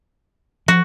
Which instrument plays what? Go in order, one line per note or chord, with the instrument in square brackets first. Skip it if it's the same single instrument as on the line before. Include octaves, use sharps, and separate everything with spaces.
[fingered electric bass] F3 [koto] F#4